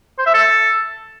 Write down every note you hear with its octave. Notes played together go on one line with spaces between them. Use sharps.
C5
E5
A4